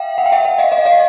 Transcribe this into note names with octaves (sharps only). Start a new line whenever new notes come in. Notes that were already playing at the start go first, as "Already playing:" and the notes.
Already playing: E5 F5 G5
F#5
G5
E5 F#5
E5 F#5
D#5 F5
D#5 F5
D#5 F5